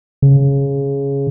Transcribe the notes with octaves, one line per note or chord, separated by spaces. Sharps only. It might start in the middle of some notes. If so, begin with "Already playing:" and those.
C#3